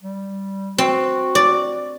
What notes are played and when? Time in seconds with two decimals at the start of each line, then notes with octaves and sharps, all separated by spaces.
0.02 G3
0.78 C4 F#4
1.35 D5